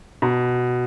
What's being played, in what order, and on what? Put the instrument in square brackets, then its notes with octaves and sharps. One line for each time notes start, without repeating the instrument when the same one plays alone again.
[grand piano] B2